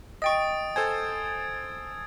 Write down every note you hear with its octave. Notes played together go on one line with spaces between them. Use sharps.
D#5 G5 C#6 D#6 A6 D7
A4 C5 G#5 G#6